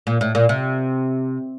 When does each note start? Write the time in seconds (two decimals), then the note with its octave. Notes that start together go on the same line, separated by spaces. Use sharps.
0.07 A#2
0.21 A2
0.35 A#2
0.49 C3